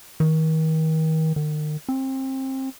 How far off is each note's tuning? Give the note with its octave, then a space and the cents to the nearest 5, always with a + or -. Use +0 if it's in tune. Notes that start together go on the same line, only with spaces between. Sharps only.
D#3 +35
D#3 -40
C4 +25